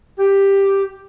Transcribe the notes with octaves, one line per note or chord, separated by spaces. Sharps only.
G4